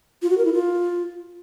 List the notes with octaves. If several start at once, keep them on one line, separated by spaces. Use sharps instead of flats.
F4
F#4
A#4
E4
F4